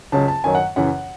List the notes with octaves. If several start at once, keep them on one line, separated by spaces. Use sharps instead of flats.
C#2 C#3 F#3 A5
A5
F#2 D#3 F#3 G#5
F#5
F#2 C#3 E3 F#5